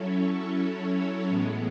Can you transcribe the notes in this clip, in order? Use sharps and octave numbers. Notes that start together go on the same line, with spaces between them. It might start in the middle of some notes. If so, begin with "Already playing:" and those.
Already playing: F#3 C#4 E4 A4 C#5
A2 E3 G#3 B3